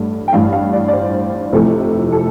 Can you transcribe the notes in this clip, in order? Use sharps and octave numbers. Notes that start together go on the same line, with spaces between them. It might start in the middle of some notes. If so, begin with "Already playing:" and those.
Already playing: A1 G2 A3
G5
A1 G2 E3 F5
F5
D5
D5
C5
F1 F2 C3 E3 A3
A4